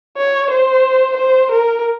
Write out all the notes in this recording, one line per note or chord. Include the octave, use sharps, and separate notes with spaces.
C#5
C5
C5
A#4